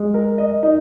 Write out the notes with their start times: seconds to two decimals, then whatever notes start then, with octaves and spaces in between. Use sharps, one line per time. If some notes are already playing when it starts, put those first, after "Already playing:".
Already playing: G#3
0.14 A#4
0.38 D#5
0.63 D#4